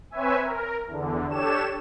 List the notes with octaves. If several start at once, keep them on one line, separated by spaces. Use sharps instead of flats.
C4 B4 C#5 E5 G#5
A#4
E2 D3
D4 G4 A4 C#5 E7